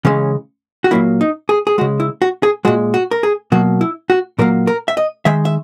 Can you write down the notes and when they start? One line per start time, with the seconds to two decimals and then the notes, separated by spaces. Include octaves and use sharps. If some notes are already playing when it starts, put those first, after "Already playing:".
0.05 C#3 E3 G#3 C#4
0.84 F#4
0.91 A#2 F#3 A#3 E4
1.21 D#4
1.49 G#4
1.67 G#4
1.78 C#3 G#3 F#4
2.00 E4
2.22 F#4
2.43 G#4
2.65 A#2 G#3 F#4
2.94 F#4
3.11 A#4
3.23 G#4
3.52 B2 F#3 A#3 F#4
3.81 E4
4.10 F#4
4.39 A#2 F#3 A#3 A#4
4.67 A#4
4.88 E5
4.97 D#5
5.25 D#3 G#3 E5
5.45 E5